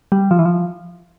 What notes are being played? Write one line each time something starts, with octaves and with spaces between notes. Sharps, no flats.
G3
F3
E3
F3